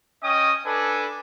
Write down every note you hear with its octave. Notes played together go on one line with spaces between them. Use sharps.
C#4 D#5 G5 D#6
D4 A4 B4 G#5